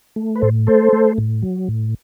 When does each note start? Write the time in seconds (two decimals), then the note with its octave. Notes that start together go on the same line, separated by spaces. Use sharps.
0.16 A3
0.35 B4
0.41 A2 A4 C5
0.67 A3 A4 C5
0.93 A3
1.18 A2
1.42 F#3
1.68 A2